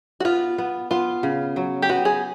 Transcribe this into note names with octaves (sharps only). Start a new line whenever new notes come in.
F#4
B3 F4
B3
B3 F4
C#3
F#3
G4
B3 F#4
G#4